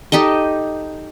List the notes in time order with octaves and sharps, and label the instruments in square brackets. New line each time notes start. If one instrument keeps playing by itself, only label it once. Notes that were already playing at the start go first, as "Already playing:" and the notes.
[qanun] D#4 G4 A4 D#5